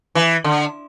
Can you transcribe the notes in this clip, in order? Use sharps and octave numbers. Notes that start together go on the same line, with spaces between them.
E3
D3